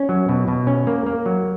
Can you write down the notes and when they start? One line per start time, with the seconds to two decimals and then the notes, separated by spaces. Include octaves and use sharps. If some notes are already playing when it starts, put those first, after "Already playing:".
Already playing: C#4
0.09 F#3
0.29 B2
0.48 B2
0.67 C#4
0.87 A#3
1.06 A#3
1.26 F#3